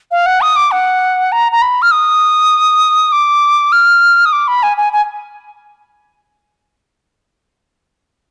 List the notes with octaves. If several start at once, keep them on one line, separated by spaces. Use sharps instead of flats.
F5
F#5
D#6
D6
F#5
A#5
A#5
B5
F6
D#6
D6
F6
D#6
D6
B5
G#5
G#5
G#5